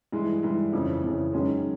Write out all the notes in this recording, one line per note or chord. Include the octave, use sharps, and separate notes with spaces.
G2 E3 G#3
G2 E3 G#3
F2 C#3 E3
F2 C#3 E3
F#2 D#3 G#3 C#4